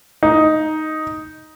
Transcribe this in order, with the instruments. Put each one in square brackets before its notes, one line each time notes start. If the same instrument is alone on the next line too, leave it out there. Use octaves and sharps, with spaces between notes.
[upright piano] D#4